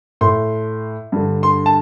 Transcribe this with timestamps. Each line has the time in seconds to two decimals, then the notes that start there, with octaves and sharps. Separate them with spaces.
0.21 A2 C6
1.12 G2 D3
1.43 C6
1.66 A5